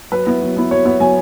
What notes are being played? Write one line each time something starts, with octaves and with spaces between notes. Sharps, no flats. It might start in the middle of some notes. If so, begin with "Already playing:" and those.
F#3 B4
B3 E4
F#3
B3 E4
F#3 C#5
B3 E4 C#5
F#3 G#5